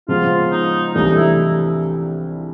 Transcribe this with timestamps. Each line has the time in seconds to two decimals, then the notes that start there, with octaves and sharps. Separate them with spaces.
0.08 C#3 F3 G#3 B3 F4
0.52 D#4
0.94 C2 C3 E3 A3 D4 D#4
1.16 E4